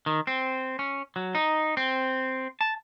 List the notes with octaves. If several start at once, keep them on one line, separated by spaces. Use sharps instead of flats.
D#3
C4
C#4
F#3
D#4
C4
A5